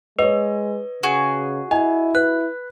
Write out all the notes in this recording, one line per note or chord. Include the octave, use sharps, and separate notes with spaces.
G#3 B4 C#5 D#5
C#3 F#4 G#4
E4 D#5 G#5
B4 F#6